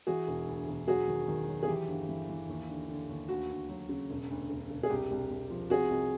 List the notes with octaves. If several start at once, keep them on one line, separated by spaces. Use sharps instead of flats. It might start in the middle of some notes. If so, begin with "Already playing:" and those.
E3 F#4 G#4
E1
D2
E1
F#3 F#4 G#4
D#3
D#3
F#3
G#4
E3 G4
G1
E3
E3
D#2
D3
D3
D#2
D2 F#4
D2
F#3
C#3
E1
D2
E1
E1
G#4
C2 G4
C2
C2
F3
C3 F#4 G#4
C2